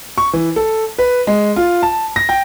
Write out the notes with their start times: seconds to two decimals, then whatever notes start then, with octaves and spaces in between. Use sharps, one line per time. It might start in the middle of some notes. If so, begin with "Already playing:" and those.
0.18 C#6
0.33 E3
0.56 A4
0.98 B4
1.27 G#3
1.56 F4
1.83 A5
2.16 A#6
2.29 G5